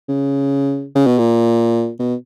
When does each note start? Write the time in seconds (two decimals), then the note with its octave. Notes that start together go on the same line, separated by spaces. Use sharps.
0.08 C#3
0.95 C#3
1.06 B2
1.18 A#2
1.99 B2